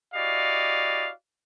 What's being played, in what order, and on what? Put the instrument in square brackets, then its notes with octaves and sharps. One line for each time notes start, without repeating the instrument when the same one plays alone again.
[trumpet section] E4 F#4 G4 D5 D#5 F5